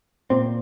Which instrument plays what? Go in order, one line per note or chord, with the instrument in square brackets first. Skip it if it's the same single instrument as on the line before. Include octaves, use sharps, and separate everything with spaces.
[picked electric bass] A#2 C4